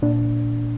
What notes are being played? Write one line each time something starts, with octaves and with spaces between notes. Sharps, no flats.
A#2 D4